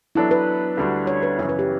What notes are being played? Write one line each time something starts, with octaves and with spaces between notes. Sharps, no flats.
F#3 B3 D4 E4 A4
B4
D2 D3 G3 D4 F#4
C#5
B4
F#2 C#3 E3 C#5
B4
G4